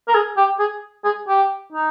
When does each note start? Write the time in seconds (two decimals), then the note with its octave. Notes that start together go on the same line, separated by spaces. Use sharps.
0.08 A#4
0.14 G#4
0.37 G4
0.60 G#4
1.05 G#4
1.28 G4
1.72 D#4